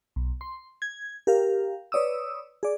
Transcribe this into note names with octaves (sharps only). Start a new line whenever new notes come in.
B1
C6
G#6
G4 A#4 F5
B4 C#5 D5 D#6 E6
G#4 D5